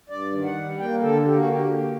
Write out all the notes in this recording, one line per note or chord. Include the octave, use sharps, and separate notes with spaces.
G2 D5
D#3
F#5
G3
A#3 G5
D3 A4
A#3 G4
F#4
D3 G4
A#3